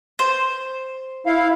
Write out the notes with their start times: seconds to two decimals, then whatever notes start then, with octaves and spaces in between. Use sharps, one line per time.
0.19 C5
1.26 E4 F5